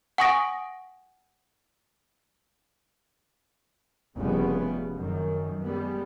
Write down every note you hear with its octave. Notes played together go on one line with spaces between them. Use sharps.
F#5 G#5 C#6 D#6 A#6 D7
F1 C#3 G3 B3
F#2 D#3
G3 G#3 B3